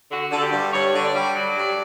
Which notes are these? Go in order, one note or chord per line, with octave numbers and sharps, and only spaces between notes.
D3 F#4
D3
A4
G4
G2
G2 C#5
D3
D5
G3
F#3
G2